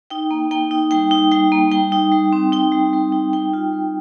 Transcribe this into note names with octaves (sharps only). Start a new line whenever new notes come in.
D#4 G5
A#3
A#3 G5
D#4
G3 G5
D#4
G3 G5
A#3
G3 G5
D#4
G3
C4
D#4 G5
G3
G3
D#4
G3 G5
F4
G3